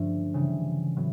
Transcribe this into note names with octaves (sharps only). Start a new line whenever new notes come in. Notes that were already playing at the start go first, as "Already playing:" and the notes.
Already playing: G2 D3 F3 A3 C#4
C#3 E3 G3
A2 F#3 B3